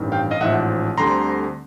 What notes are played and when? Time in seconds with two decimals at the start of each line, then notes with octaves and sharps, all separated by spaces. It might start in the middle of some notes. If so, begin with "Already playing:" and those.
Already playing: A1 G2 D#3 G3 C4
0.12 F5 G5
0.31 D#5 F5
0.40 A1 G#2 F3 E5 F#5
0.97 D2 D3 G3 C4 A#5 C6